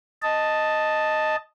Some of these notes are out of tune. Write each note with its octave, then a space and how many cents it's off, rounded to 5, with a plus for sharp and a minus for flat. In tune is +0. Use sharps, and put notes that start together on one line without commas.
D#5 +0 A5 +0